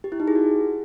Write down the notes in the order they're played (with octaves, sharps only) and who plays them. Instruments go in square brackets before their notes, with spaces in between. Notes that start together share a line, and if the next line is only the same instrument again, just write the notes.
[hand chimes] G4
E4
D#4
G#4
F#4